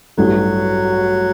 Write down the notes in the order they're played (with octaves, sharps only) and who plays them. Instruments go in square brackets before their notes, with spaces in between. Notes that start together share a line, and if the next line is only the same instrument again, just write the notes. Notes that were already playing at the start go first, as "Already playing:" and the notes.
[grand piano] A1 G2 E3 A3 [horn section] F#3